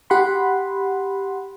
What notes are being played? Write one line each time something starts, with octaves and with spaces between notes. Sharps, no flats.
G4 F#5 B5 C6